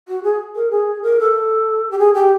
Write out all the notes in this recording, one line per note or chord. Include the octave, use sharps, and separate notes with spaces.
F#4
G#4
A#4
G#4
A#4
A4
G4
G#4
G4